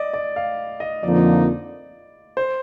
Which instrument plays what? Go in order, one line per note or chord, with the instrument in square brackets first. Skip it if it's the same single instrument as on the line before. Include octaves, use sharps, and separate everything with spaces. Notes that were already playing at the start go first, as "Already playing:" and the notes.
Already playing: [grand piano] D5 D#5
D5
F5
D#5
[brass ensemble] F2 D3 F3 A#3 D#4 [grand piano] D5
[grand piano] C5